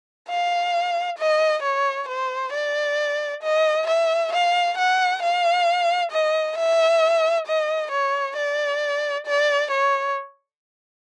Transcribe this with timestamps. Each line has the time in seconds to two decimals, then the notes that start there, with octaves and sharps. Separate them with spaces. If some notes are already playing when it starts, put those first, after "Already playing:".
0.29 F5
1.18 D#5
1.63 C#5
2.08 C5
2.53 D5
3.43 D#5
3.87 E5
4.33 F5
4.78 F#5
5.23 F5
6.11 D#5
6.58 E5
7.47 D#5
7.91 C#5
8.36 D5
9.27 D5
9.71 C#5